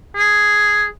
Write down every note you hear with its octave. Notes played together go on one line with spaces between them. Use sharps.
G#4